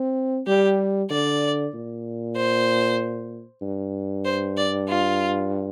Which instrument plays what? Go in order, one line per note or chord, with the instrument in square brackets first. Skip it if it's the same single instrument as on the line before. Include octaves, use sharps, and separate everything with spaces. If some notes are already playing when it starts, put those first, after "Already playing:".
Already playing: [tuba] C4
[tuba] G3 [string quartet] G4
[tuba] D3 [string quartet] D5
[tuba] A#2
[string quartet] C5
[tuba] G2
[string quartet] C5
D5
F4